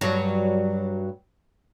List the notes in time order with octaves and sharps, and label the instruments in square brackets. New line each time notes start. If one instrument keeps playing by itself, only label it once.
[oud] G2 F#3